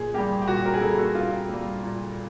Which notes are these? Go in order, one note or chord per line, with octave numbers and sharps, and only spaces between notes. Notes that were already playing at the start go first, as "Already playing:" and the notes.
Already playing: A#2 G#4
G3 A#3 G4
G4
A#2 F#4
A#4
G#4
G3 A#3 A4
F#4
A#2 F4
G3 A#3
A#2